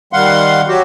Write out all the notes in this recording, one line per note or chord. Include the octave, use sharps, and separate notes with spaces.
D#3 G3 F5 F#5 C6
F#3 F#4 G4